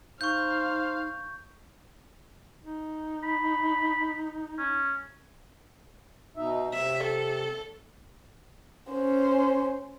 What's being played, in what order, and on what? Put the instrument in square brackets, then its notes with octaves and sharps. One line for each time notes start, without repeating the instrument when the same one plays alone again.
[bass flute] D#4 [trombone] C5 [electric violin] F5 [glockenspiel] C#6 G6
[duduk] D#4
[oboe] B5
C#4
[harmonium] B2 D#4 E5
[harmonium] C3 [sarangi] E5
[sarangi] A4
[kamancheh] C#4 C5